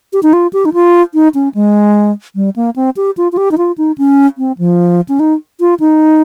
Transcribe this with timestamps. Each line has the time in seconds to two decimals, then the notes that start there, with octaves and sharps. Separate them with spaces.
0.13 G4
0.23 D#4
0.33 F4
0.53 G4
0.65 D#4
0.74 F4
1.14 D#4
1.34 C#4
1.55 G#3
2.36 G3
2.56 A#3
2.76 C4
2.97 G4
3.17 F4
3.32 F4
3.37 G4
3.51 D#4
3.58 F4
3.78 D#4
3.98 C#4
4.38 C4
4.58 F3
5.09 C#4
5.20 D#4
5.60 F4
5.80 D#4